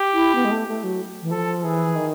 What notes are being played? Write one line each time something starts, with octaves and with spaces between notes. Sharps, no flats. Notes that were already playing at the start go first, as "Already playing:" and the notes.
Already playing: G4
E4
B3
G#3
A3
A3
F#3
E3
F3 A4
E3 G#4
D#3